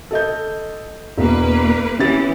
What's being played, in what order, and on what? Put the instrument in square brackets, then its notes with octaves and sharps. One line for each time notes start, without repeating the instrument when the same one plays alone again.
[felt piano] A4 D#5 G6
[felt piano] E1 [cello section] A#3 B4
[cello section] E3 B3 [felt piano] C#4 G4 A6